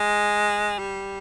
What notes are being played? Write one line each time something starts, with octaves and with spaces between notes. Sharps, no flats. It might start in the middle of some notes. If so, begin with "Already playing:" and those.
Already playing: G#3
G3